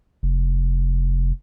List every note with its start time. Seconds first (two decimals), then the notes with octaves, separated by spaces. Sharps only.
0.23 F1